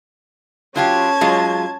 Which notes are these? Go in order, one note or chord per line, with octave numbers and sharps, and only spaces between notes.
F#3 C#4 F4 G4 A5 G#6
F#3 G#3 F4